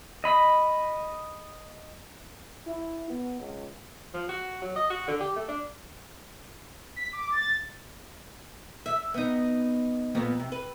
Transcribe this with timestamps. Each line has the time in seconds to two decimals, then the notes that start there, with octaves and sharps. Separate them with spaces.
0.24 D#5 B5
2.67 E4
3.10 B3
3.40 C#2
4.14 F3
4.29 F#4
4.62 F#3
4.76 D#5
4.90 F#4
5.08 D3
5.20 G4
5.36 A3
5.49 D4
6.96 B6
7.13 D6
7.30 A6
8.86 E5
9.14 B3 D#4
10.15 F2 A#2 B3
10.40 C3
10.52 B4